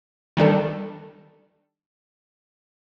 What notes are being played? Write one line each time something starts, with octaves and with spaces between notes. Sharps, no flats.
D#3 G3 D4 A4